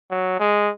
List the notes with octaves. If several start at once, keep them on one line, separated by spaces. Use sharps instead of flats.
F#3
G#3